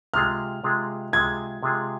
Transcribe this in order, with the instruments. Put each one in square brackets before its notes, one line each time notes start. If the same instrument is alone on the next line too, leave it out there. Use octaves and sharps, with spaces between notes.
[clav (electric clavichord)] C3 G#3 F4 G#4 [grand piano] F6
[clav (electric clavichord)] C3 G#3 F4 G#4
[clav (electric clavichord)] C3 G#3 F4 G#4 [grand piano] G#6
[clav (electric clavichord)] C3 G#3 F4 G#4